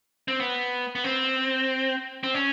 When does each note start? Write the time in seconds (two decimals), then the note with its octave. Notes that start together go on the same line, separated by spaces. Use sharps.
0.28 C4
0.40 B3
0.95 B3
1.04 C4
2.23 C4
2.34 C#4